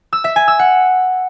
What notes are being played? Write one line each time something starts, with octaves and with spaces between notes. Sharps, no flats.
E6
E5
G#5
E6
F#5